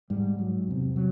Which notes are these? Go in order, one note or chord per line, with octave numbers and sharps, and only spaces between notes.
G#2 G3
F#3
E2 C3
F#3